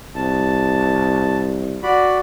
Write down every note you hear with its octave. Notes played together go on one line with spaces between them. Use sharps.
C2 A5
F#4 D5 B5